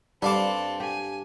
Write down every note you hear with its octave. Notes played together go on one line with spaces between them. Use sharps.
G2 C4 D4 A4 F5 D6
G4 G#5